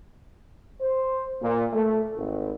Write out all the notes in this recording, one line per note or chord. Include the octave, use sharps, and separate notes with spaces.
C5
A#2
A3
G#1